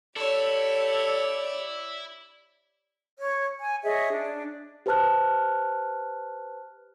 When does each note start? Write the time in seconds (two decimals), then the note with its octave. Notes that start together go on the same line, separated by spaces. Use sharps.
0.17 E4 G4 A4 C#5 D5
3.18 C#5
3.61 G#5
3.84 G#4 C#5 D#5 E5
4.11 D4
4.86 G4 B4 C5 A5 F6 F#6